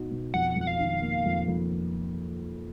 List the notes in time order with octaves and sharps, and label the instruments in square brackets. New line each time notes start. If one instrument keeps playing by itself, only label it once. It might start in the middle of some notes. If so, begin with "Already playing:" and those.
Already playing: [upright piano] B2 D#4 F#4
B2
[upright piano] F2 [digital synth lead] F#5
[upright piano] F2
[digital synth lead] F#5
F5
[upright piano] D#3
A#3
F2
F2